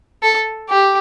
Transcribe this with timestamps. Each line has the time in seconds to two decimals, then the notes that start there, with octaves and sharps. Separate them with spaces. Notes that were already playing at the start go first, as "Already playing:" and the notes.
0.23 A4
0.69 G4